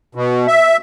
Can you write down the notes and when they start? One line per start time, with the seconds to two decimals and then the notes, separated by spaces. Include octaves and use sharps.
0.15 B2
0.47 E5